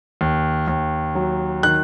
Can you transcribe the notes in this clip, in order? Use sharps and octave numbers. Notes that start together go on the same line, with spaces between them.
D#2
D#2
F#3
D#3 F#6